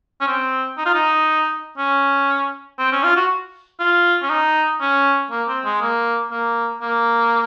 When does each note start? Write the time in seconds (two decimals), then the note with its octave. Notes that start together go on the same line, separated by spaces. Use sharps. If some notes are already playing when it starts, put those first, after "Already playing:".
0.21 C#4
0.27 C4
0.77 D#4
0.86 F4
0.94 D#4
1.78 C#4
2.79 C4
2.92 C#4
3.03 F4
3.16 F#4
3.80 F4
4.22 C#4
4.30 D#4
4.81 C#4
5.31 A#3
5.47 C4
5.65 G#3
5.81 A#3
6.31 A#3
6.82 A#3